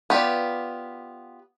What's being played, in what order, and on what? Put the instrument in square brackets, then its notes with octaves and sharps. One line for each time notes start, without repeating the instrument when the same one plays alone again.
[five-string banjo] B3 F4 G4 D5